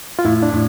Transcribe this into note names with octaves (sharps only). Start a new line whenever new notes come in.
F4
A2 E4
D4
A2